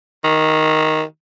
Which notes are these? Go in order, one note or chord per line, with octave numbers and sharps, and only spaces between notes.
D#3